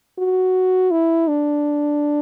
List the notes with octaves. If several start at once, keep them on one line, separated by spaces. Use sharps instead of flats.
F#4
E4
D4